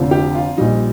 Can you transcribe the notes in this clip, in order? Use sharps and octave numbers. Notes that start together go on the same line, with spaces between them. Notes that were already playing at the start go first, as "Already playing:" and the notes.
Already playing: F1 F2 D3 F3
G4
F4
A#1 A#2 G3 D#4